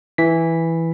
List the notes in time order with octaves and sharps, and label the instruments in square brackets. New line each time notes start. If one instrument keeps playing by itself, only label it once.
[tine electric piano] E3 B6